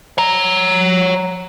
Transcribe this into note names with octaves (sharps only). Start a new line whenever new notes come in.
C#5 A#5